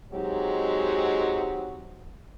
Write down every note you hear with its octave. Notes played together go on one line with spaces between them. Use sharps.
F#3 G#3 C4 D#4 F#4 G4